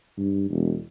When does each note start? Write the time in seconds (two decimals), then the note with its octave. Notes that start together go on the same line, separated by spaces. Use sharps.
0.17 G2
0.50 E1